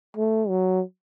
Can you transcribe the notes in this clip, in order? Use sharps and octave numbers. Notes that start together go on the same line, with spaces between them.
A3
F#3